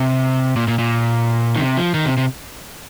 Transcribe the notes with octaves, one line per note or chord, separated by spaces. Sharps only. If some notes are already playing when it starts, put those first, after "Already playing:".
Already playing: C3
A#2
A#2
A#2
D#3
C3
F3
D#3
C3
C3